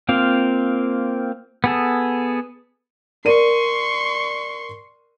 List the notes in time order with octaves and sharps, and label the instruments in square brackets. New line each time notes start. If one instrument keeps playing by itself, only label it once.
[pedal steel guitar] A#3 C4 F4 F5
B3 G#4 A4
[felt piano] A#4 D5 D#7 [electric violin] C6 C#6